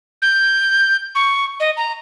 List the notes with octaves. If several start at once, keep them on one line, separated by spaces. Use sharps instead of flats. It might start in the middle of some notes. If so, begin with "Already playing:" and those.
G6
C#6
D#5
A#5